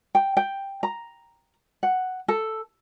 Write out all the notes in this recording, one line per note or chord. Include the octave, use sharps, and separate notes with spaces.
G5
G5
A#5
F#5
A4